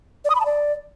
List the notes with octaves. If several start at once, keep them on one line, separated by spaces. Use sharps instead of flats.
D5
D#6
B5
A5
D5